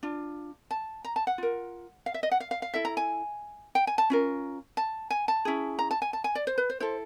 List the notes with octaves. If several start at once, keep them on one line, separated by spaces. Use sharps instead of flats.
D4 F4
A5
A#5
A5
F#5
F4 A#4
F5
E5
D#5
F#5
F5
F5
F5
E4 A4 E5
A#5
G#5
G5
G#5
A5
C#4 F4 A#4
A5
G#5
A5
C#4 E4 G#4
A#5
A5
G#5
A5
G#5
D5
C5
B4
C5
E4 A4 C5